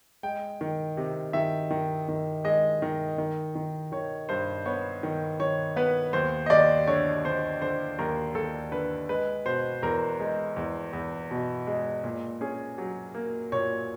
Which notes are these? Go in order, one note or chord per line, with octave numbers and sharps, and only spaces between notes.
G#3 G5
D#3
C3
D#3 E5
D#3
D#3
G#3 D#5
D#3
D#3
D#3
D#3 C#5
G2 C5
B3 C#5
D#3
D#3 C#5
B3 B4
D#2 C5
D#5
D#2 D5
D3 C#5
D3 C5
D3 C5
D#2 A#4
D#2 A4
D3 B4
G#3 B4
B2 C5
E2 A#4
G#3
E2
E2
B2
G#3
A#2
C#4 G#4
F#3
A#3
A#2 C#5